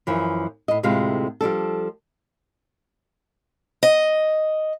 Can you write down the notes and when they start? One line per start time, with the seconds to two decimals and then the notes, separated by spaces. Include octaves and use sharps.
0.07 F#2 E3 F3
0.68 A2 D#5
0.83 D2 A2 C3 G#3 F4 F5
1.41 F3 G3 D4 A4
3.83 D#5